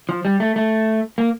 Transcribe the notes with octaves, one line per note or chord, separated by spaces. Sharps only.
F3
G3
A3
A3
A#3